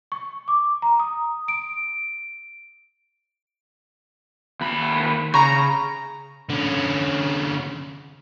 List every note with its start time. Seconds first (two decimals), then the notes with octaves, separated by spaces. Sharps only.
0.12 C#6
0.48 D6
0.82 A#5
1.00 D#6
1.48 D7
4.61 D#2 B5
5.34 C#3 A#5 B5 C#6
6.50 D3 C#4